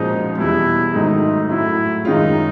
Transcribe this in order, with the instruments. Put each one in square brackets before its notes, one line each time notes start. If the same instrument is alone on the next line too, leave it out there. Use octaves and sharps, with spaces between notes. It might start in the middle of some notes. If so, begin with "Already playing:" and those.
Already playing: [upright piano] A#2 F3 G#3 C#4 F#4 [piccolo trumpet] D#4
[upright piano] E2 B2 G3 [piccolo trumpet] E4
[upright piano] G#2 D#3 F#3 A3 [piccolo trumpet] D#4
[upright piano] A2 F#3 A3 [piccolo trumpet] E4
[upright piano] F#2 D#3 G#3 C#4 F4 [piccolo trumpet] D#4